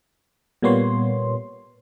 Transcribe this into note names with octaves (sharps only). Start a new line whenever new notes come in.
A#2 G3 A#3 B3 C#5 C6